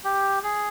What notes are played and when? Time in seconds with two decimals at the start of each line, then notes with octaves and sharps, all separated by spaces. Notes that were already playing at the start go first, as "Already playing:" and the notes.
0.04 G4
0.43 G#4